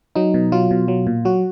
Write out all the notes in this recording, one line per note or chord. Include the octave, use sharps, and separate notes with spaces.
F#3 D#4
B2
F#3 F4
B2
F#3
A#2
F#3 F#4